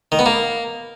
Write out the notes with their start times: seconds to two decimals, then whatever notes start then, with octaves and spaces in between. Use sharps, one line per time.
0.12 D#3
0.19 B3
0.26 A#3